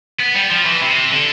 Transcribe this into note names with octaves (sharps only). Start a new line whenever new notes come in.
B3
G3
F3
E3
C3
D3